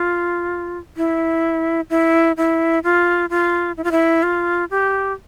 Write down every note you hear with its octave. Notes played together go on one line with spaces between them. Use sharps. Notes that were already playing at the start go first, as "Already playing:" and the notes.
Already playing: F4
E4
E4
E4
F4
F4
E4
F4
E4
F4
G4